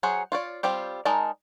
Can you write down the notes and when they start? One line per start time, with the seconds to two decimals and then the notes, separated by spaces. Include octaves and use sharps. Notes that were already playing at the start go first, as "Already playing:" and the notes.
0.03 F#3 G#4 C5 F#5
0.32 F4 C#5 D5
0.63 G3 C4 F4 G4
1.05 G#3 D#4 A#4 D5 A5